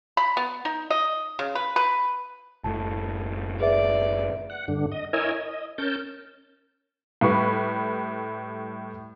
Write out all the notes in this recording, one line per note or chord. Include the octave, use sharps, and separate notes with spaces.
B5
B3
D#4
D#5
C#3
B4
B4
F#1 A2 A5
G#4 B4 D5 E5
F#5
G2 D3
D#5
E4 A#4 C#5 D#5 G#5 E6
D#5
C#4 A#4 A5 G6
A2 G3 B4 B5 C#6